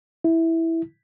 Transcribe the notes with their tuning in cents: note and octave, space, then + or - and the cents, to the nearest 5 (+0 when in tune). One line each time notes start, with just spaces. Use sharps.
E4 -5